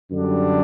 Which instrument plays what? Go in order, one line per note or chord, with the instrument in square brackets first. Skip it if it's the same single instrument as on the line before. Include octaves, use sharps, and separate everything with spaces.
[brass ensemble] F#2 D3 G3 D4